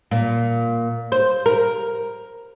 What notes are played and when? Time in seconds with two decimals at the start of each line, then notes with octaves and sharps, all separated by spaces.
0.11 A#2
1.12 C5
1.46 A#4